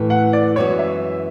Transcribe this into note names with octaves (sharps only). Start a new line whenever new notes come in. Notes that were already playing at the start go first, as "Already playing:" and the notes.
Already playing: A2 E3 A3
F#5
D5
F#2 E3 G#3 B3 F#4 C#5
E5